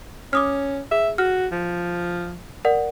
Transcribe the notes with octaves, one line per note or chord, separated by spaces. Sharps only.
C#4 D6 D#6 F6
G#4 E5
F#4 F6
F3
A#4 D5 F#5